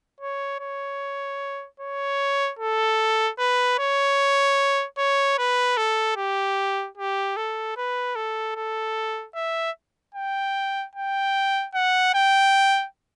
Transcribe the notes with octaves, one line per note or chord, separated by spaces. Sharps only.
C#5
C#5
C#5
A4
B4
C#5
C#5
B4
A4
G4
G4
A4
B4
A4
A4
E5
G5
G5
F#5
G5